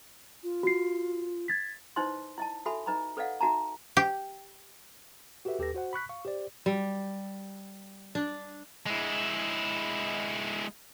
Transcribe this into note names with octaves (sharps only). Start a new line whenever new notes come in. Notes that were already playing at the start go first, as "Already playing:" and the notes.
F4
F#4 C7
G#6 A6 B6
D#4 E4 B4 C5 D#5 C6
E4 D#5 A5
F#4 A4 E5 G#5 B5
D#4 B4 D#5 A#5 B5
A4 B4 D5 D#5 F5 F#5
D#4 F#4 E5 A5 A#5
G4
F#4 G4 A4 B4 E5
D#2 G4 A4 B4 A#6
F#4 C5 F#5
B5 C#6 F#6 B6
F5 C#6
G4 C5 D5
G3
D4
G#3 E4